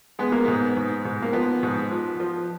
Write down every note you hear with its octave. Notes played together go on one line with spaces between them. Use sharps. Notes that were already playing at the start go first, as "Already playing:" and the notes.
G#3 B3
A#3
G#2 B3
G#2
G#2
A#3
F3 B3
G#2
F3
F3